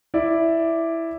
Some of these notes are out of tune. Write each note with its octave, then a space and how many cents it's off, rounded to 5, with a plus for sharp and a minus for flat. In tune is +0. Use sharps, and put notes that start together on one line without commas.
E4 +0 D5 +0